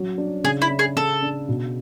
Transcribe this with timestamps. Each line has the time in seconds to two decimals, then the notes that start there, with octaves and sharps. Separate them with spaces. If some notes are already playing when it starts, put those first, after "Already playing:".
Already playing: F#3 C#4
0.18 D4
0.44 C#3 G#4
0.62 E4
0.70 C#4
0.79 G#4
0.96 C#3 A4
1.22 D4
1.49 B2